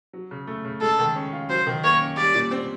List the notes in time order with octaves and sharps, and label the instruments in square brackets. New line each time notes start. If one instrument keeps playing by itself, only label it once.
[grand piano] F#3
C#3
A3
C#3
[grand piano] G#3 [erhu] A4
[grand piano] D#3
C#4
F4
[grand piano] F#3 [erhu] C5
[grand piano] D#3
[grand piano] A#3 [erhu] C#5
[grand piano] C#4
[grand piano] G3 [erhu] D5
[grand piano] A#2
C4